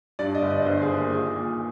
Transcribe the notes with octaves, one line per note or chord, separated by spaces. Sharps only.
G2 D5
D#5
G1
D#5
G1 C5
G#4
D#3
A#3
A#2 G#4
A#2